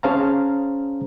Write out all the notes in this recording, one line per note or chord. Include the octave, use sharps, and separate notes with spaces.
C#4 G#4 C5 F5 A5 A#5